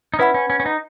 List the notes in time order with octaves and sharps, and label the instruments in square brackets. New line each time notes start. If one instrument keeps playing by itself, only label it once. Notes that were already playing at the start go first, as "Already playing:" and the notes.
[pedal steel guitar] D#4
[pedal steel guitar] C#4 E4 [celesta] B4 F#5 B5
[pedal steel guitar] C#4
C#4
C#4
D#4